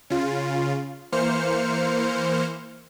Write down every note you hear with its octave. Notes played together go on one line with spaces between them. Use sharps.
C#3 F4
E3 A#3 C5 F6 C#7